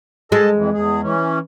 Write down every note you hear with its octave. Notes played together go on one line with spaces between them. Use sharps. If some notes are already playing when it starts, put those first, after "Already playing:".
G#3 A4 D#5 A5
F2 E3
E2 G#4
E3 C#4